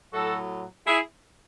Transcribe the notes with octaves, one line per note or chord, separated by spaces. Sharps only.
A2 F#3 F#4 A4
E4 G#4